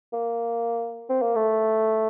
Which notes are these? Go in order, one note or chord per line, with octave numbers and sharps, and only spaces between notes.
A#3
C4
A#3
A3